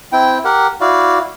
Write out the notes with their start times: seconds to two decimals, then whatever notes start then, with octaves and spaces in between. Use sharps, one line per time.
0.12 C4 E4 G5
0.45 G4 A#4 F#5
0.81 E4 F#4 D5 F5